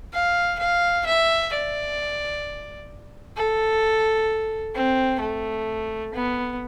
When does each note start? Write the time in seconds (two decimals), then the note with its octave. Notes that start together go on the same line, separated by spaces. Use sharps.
0.13 F5
0.59 F5
1.06 E5
1.52 D5
3.36 A4
4.75 C4
5.21 A3
6.14 B3